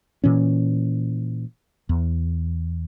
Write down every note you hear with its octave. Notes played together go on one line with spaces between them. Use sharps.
A#2 E3 C#4
E2